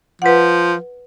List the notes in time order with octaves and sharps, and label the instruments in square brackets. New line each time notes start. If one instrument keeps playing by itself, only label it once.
[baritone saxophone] F3 [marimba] B4 F#5